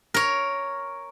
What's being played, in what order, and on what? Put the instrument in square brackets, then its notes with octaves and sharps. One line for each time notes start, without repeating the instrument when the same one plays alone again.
[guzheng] A#4 C#5